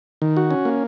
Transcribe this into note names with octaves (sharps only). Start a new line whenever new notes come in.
D#3
F#4
C#4
A#3